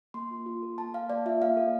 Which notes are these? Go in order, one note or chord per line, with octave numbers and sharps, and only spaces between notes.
A#3 C6
F4
F4
A4
A#3 A5
A#3 F5
A#3 D5
F4 E5
A#3 F5
A4